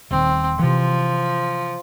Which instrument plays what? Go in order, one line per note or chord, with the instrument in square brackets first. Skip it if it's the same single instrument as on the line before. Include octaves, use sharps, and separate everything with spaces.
[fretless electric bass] D#1 D#3 [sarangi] C4
[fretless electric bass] C3 E3 [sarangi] F3